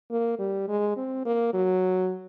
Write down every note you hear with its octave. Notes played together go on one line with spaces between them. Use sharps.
A#3
G3
G#3
C4
A#3
F#3